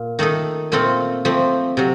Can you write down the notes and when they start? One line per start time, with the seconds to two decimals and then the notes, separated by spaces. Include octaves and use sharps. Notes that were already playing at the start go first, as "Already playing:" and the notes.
Already playing: A#2
0.19 D#3 A3 D#4 A4
0.72 A#2 A3 C4 F4 A4
1.25 F3 A3 C4
1.77 C3 F#3